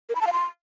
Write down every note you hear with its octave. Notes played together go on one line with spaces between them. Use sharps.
A#4
B5
A5
F5
C6